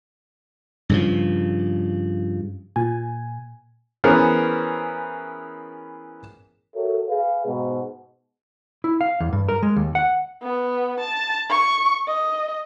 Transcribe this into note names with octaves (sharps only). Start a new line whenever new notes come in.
G2 C#3 F3
A#2 G#5
E3 B3 C#4 G#4 A#4 C5
F#4 A4 A#4 C#5 E5
G#4 B4 F5
G#2 B2
E4
F5
E2
G2
A#4
G#3
D#2
F#5
B3
A5
C#6
D#5